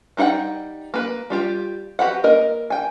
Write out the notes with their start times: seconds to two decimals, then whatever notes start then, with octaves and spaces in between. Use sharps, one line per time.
0.17 G3 D#4 A#4 F#5 G5
0.94 A#3 B4
1.30 G3 F4 G4
1.99 F#4 G4 B4 F#5
2.24 A#3 A#4 D#5
2.70 G5 G#5